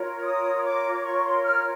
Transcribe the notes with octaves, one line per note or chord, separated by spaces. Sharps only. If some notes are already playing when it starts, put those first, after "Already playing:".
Already playing: F4 A#4 C#5
D#6
D6
D6
C#6
C6
F6